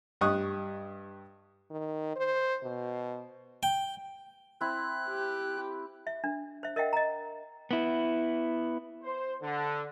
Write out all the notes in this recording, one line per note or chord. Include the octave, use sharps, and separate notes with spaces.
G2 G4 D#5 C#6 D#6 F#6
D#3
C5
B2
G5
C4 E4 F#6
G4
E5
D4
C5 E5
A#4 D#5 E5 F#5 G5
D#5 A#5
B3 E4
C5
D3